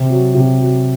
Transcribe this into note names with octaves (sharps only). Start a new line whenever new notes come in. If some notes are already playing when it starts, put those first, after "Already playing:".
Already playing: C3
F#3
C3
F#3